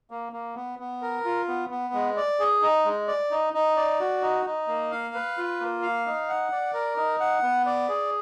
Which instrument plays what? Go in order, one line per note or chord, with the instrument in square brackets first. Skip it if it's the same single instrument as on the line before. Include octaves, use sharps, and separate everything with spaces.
[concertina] A#3
A#3
B3
B3
A#4
F4
B3
B3
G#3
D5
G#4
D#4
G#3
D5
D#4
D#4
D5
F#4
D#4
D#4
A#3
F5
B4
F4
A#3
F5
D#4
F#5
D5
A#4
D#4
F#5
B3
D5
G#4